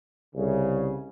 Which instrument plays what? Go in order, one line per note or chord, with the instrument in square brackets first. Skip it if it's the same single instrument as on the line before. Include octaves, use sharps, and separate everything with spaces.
[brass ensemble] C2 C#3